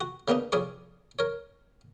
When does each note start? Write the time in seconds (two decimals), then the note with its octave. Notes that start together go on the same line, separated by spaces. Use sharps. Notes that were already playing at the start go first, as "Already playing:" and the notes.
0.01 F#4
0.28 C#3 A#3 B3 D4 D#4
0.52 C2 F2 C#4 G#4 D5 C#6
1.19 A#4 C#5